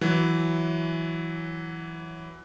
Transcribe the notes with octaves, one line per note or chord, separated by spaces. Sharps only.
E3 F#3